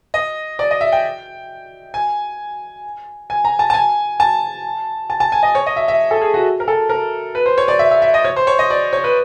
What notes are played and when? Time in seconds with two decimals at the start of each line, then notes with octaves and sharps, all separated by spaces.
0.14 D#5
0.59 D5
0.71 D#5
0.81 E5
0.92 G5
1.94 G#5
3.30 G#5
3.45 A#5
3.59 A5
3.70 A5
3.74 G#5
4.20 A5
5.10 A5
5.20 A5
5.32 G#5
5.43 D#5
5.55 C#5
5.66 D#5
5.76 E5
5.88 E5
6.11 A4
6.22 G#4
6.34 F#4
6.60 A#4
6.68 A4
6.89 A#4
7.35 B4
7.46 C5
7.58 C#5
7.68 D5
7.79 E5
7.91 E5
8.02 E5
8.14 D#5
8.25 C#5
8.36 C5
8.47 C#5
8.59 D#5
8.70 D5
8.93 C#5
9.04 B4